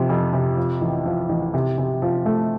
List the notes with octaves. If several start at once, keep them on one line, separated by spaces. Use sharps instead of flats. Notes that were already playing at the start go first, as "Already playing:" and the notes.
Already playing: C3 F3
F2
C3
F3
A1
F3
A1
C3
C3
F3
A3